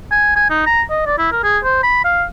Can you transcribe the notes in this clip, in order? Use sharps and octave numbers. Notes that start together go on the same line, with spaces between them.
G#5
G#5
D#4
A#5
D#5
D5
E4
A#4
G#4
C5
B5
F5